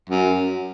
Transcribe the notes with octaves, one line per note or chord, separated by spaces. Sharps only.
F#2